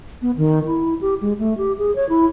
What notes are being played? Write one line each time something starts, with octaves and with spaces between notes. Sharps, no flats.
B3
D#3
E4
G4
G#3
A3
G4
G#4
C#5
E4